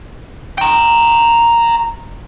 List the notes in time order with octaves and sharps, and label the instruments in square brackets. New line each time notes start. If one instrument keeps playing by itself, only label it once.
[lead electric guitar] G5 A#5